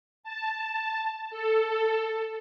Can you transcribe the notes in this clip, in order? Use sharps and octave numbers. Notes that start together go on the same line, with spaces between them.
A5
A4